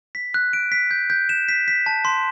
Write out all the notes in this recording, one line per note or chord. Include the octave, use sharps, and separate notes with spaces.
B6
F#6
D7
B6
G6
G6
E7
B6
B6
A5
C6